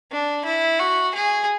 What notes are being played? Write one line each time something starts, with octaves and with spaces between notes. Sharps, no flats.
D4
E4
F#4
G#4